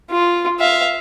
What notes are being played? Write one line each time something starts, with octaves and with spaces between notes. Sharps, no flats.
F4
E5 F5